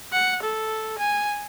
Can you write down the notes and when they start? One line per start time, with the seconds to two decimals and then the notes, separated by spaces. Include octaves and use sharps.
0.13 F#5
0.43 A4
0.99 G#5